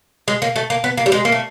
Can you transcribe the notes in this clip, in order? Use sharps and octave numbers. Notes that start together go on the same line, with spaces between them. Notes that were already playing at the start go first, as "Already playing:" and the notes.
G#3
A#3
A3
A#3
B3
A#3
G3
G#3
A#3
A3